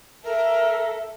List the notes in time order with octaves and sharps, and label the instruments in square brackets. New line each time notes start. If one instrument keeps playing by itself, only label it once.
[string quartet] A4 [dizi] A#4 [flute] E5